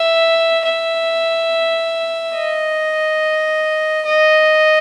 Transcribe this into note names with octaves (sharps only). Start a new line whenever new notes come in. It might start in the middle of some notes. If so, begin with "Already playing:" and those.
Already playing: E5
E5
D#5
D#5